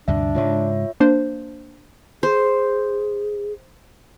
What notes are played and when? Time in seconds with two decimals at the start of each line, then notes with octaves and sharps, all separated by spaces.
0.08 D2 G2 C3 D4 E5
0.35 G#2 C#3 G#3 F4 C#5 E5
1.00 A#3 D4 C5
2.23 G#4 C5